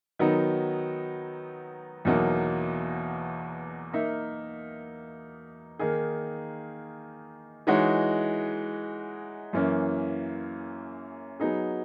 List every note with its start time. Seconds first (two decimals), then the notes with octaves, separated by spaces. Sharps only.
0.19 D#3 F#3 B3 D#4
2.05 E2 B2 F#3 A#3 D#4
3.92 A#3 D#4 A#4 E5
5.79 D#3 A#3 D#4 G#4
7.67 E3 G#3 D#4 F#4 C#5
9.53 F#2 E3 A#3 C#4
11.40 F#3 B3 D#4 G#4